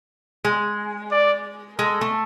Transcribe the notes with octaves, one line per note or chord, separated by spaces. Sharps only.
G#3
D5
G#3 A4
A3